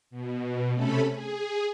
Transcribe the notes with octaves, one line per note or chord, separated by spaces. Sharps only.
B2
C3 A3 C#4 A4 B5
G#4